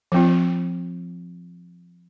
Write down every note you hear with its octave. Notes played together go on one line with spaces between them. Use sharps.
F3 C4 F4